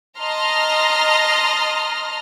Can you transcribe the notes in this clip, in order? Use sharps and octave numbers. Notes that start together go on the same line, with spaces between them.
D#5 A5 A#5 C6 F6 A#6